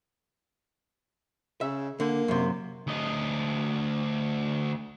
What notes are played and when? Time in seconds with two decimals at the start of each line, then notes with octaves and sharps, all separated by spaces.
1.61 C#3 E5
2.00 D3 A#3
2.28 F#2 C3
2.87 D2 D#5